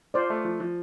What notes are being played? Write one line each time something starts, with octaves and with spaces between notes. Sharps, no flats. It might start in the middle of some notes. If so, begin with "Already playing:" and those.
F4 C5 D5
A3
F3
F3